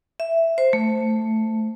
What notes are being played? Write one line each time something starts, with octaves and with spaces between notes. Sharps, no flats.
E5
C5
A3